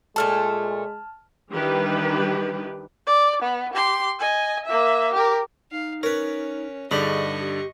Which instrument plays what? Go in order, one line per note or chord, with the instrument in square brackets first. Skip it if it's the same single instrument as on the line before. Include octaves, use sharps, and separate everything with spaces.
[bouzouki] A#2 A3 A4 [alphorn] G#3 [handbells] A5 F6
[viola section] D#3 E3 G3 D4 G4 B4
[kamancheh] D5
B3
G4 C6
D#5 G#5
A#3 E5
G4 A#4
[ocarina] D#4 [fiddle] F5
[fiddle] C#4 [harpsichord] A#4 B4 [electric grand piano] C#5
[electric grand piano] G2 D3 D5 [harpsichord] D#4 B5 [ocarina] G#4 [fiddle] D#5 C#6
[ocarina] G4